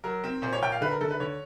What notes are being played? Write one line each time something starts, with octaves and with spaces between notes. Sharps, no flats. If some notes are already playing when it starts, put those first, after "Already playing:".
F#3 A#4
C4
A#2 C5
C#5
A#2 G5
F5
D3 B4
A#4
D3 A4
B4
D3 C#5